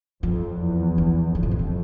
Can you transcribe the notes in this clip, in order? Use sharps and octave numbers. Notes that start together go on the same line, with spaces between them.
F2 F3
E2
E3
F2 D3
C3
B2
C3